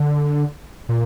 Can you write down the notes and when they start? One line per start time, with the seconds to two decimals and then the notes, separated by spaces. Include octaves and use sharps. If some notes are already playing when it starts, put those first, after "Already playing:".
Already playing: D3
0.89 A#2